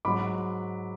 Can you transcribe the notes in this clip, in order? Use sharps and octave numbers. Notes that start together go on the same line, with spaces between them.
G#2 F#3 B5 D6